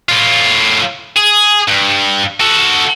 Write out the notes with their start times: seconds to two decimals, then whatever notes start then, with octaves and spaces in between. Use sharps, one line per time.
0.09 A2 F4
1.16 G#4
1.68 G2
2.40 F#4 A4